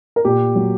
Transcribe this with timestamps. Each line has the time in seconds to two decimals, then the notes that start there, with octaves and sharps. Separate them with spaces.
0.16 A#4
0.25 A#2 G4
0.55 F#3